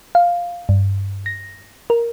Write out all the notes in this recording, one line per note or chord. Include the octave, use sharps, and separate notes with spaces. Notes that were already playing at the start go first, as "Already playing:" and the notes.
F5
G2
A#6
A#4